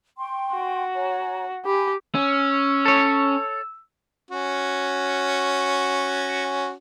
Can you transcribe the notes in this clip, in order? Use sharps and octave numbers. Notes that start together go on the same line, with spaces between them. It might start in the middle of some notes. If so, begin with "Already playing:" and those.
G5 C6 C#6
F#4
C#5 G#5 A#5
G4 G#5 B5
C#4 E6
A4 C#5
C#4 F#4